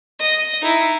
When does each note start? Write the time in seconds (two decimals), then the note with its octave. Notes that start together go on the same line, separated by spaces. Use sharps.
0.19 D#5
0.61 D#4 E4